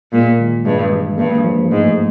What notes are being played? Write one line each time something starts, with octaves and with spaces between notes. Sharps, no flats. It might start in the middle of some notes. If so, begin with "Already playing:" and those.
A#2 G#3
D#3
G2 G#3
E3
G2 A#3
F3
G#2 A3